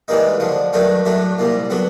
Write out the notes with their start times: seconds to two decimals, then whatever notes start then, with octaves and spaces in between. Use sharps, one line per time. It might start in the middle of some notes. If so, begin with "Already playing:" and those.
0.08 G#2 E3 G3 A#3 D#4
0.40 D2 D3 F3
0.73 G2 D#3 F#3 A3 D4
1.05 A2 F#3 A3 D4
1.39 C2 A#2 G3
1.70 D3 F#3 B3